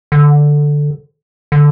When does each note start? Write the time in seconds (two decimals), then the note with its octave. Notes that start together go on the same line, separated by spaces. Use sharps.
0.12 D3
1.52 D3